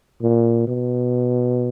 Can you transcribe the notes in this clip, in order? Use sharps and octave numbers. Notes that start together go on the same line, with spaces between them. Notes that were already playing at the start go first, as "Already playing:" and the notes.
A#2
B2